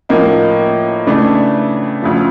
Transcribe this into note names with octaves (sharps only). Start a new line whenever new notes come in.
A2 F3 A#3 D#4
C#3 E3 A3 D4
D2 C#3 F3